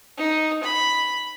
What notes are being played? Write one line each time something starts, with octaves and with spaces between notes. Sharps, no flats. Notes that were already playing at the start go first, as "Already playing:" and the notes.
D#4
B5